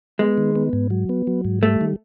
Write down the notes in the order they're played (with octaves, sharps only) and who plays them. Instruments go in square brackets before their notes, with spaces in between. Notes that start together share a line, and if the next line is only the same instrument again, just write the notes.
[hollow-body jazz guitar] G#3 [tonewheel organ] B3
[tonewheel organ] D#3
B3
G#2
F#3
B3
F#3
G#2
[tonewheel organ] G3 [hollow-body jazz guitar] A3
[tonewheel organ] D#3